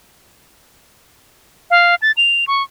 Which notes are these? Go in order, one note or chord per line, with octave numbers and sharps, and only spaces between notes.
F5
A6
F7
C#6